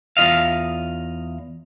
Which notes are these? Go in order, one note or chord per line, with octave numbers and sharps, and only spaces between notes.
E2 F4 D#5 F5